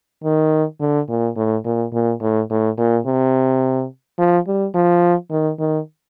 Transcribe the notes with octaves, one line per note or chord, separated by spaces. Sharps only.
D#3
D3
A#2
A2
A#2
A#2
A2
A2
A#2
C3
F3
G3
F3
D#3
D#3